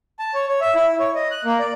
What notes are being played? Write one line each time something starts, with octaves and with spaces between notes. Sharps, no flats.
A5
C#5
C#5
E5
E4
C#5
D#5
F#6
A#3
D5